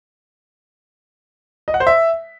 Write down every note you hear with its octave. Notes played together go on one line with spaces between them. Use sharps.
D#5
F#5
C5
E5